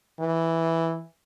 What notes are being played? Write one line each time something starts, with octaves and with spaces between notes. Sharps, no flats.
E3